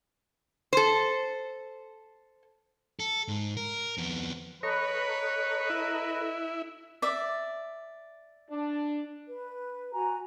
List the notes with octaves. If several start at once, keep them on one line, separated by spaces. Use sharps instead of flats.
A4 C5
A4
G#2
A#4
F2 B3
A4 B4 C#5 D#5 A#5
E4
D5 E5
D4
B4
F#4 G#5 A#5